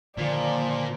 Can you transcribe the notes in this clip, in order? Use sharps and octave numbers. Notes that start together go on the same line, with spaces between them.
A#2 D3 D#3 F3 D5